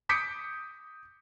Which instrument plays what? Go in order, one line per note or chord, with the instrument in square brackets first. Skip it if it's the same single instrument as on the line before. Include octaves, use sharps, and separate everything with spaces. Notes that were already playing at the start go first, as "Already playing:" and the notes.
[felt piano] D6 D#6 G6 B6 C#7 D7